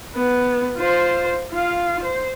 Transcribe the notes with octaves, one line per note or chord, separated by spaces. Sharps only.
B3
F4 C5
F4 F5
C5